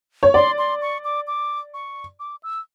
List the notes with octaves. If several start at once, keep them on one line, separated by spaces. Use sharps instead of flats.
C#5
D5 C6
C6
C#6
D6
D6
C#6
D6
E6